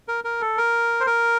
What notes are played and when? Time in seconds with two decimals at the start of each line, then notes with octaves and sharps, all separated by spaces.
0.08 A#4
0.24 A#4
0.41 A4
0.58 A#4
1.01 C5
1.07 A#4